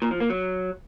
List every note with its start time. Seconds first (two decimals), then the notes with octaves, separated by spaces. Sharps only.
0.02 A#2
0.11 F3
0.20 A#3
0.30 F#3